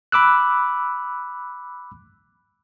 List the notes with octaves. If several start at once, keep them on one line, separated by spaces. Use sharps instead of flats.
B5 D6 E6 F#6